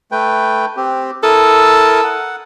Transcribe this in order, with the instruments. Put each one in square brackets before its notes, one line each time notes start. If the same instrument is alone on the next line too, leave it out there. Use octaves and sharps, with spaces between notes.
[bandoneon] A3 B4 G5
C4 G4
[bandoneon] E4 A#4 D#6 [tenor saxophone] A4
[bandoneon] F#5